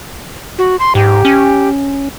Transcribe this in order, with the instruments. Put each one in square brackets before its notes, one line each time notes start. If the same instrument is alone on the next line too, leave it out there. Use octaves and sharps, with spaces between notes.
[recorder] F#4
C6
[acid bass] G#2 [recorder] G4
[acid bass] C#4